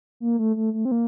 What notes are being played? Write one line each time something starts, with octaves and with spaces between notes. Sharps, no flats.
A#3
A3
A3
A3
C4
A#3